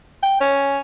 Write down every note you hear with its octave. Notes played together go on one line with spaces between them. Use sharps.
G5
C#4